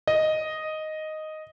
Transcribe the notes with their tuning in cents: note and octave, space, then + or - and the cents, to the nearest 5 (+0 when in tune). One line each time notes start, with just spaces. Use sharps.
D#5 +0